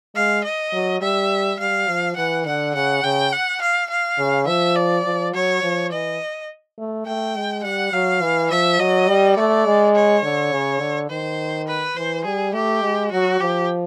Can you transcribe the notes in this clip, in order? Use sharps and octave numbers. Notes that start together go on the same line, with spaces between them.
G#3 F5
D#5
F#3
G3 E5
G3 F5
F3
E3 F#5
D3 F#5
C#3 F#5
C#3 G5
F#5
F5
F5
C#3
F3 E5
D5
F3
F#3 C#5
F3
E3 D#5
A3
A3 G5
G#3
G3 F#5
F#3 F5
E3
F3 E5
F#3 D#5
G3
A3 D5
G#3
C#5
D3
C#3
D3
D#3 C5
B4
E3 C5
G3 G#4
A3 G4
G#3
F#3 F#4
F3 G4